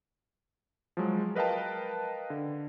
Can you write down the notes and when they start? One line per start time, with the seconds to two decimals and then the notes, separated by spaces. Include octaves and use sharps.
0.97 F3 F#3 G#3
1.35 A#4 B4 D#5 F5 G5 A5
2.30 D3